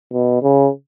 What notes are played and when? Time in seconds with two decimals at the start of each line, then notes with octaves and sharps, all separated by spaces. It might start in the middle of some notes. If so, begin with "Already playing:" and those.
0.13 B2
0.43 C#3